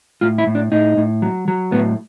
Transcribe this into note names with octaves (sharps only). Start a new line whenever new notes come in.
A2 F4
E4
A2
D4
A2 D#4
A2
F#3
F#3
A2 B3